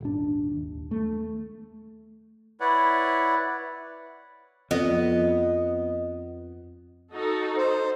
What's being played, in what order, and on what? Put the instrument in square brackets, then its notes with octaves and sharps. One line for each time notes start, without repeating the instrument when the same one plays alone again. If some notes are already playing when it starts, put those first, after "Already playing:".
[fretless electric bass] D#1 G#1 D4
D#2
A3
[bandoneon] E4 B4 C#5 D5 F#5
[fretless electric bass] F2 [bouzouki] B3 D#5
[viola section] D#4 F#4 A4
[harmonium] C5